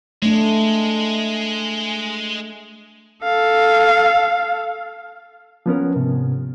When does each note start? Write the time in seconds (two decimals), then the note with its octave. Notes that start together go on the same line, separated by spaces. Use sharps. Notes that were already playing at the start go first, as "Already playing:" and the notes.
0.22 G#3 A3 D4
3.23 A4 F5
5.66 F3 B3 C#4 A#4
5.96 G#2 C3